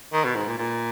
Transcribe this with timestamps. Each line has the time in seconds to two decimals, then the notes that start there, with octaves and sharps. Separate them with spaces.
0.13 D#3
0.25 B2
0.35 G#2
0.47 A#2
0.58 A#2